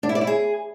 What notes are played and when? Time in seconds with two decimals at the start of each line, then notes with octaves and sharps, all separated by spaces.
0.03 D4
0.09 E4
0.15 D5
0.21 E4
0.27 G#4